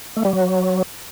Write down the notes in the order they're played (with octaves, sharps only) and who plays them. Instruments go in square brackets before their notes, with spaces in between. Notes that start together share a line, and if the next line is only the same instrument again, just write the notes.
[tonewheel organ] A3
G3
F#3